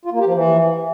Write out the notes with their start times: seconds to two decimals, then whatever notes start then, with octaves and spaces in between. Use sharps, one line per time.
0.05 F4
0.12 A#3
0.19 G4
0.26 F3
0.34 E3